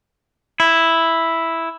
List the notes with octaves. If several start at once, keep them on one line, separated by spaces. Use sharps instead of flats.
E4